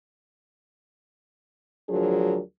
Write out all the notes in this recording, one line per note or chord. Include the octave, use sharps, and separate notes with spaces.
D2 F3 F#3 D4 G#4 A#4